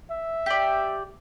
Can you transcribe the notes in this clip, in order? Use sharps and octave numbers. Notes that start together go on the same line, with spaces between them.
E5
G4 D5